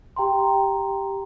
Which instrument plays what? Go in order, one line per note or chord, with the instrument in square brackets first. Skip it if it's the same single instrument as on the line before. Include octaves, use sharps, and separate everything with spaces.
[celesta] G4 G5 A#5 C6